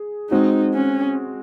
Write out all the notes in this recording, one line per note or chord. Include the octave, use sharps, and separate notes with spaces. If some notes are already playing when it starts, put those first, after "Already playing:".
Already playing: G#4
G#3 C4 D#4 F#4
C#4